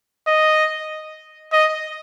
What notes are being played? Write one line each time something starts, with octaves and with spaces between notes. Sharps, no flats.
D#5
D#5